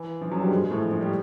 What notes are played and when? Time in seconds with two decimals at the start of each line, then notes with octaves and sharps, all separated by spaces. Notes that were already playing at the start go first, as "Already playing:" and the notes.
Already playing: E3
0.21 F3
0.31 F#2 F#3
0.41 G2 G3
0.51 G#2 G#3
0.61 G#2 G#3
0.71 A2 A3
0.81 F3
0.91 F3
1.01 G3